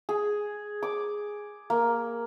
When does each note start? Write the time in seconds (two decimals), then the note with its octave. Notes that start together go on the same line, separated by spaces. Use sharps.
0.09 G#4
0.83 D6
1.70 A#3